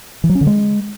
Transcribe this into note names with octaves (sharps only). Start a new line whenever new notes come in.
E3
F#3
C#4
D3
G#3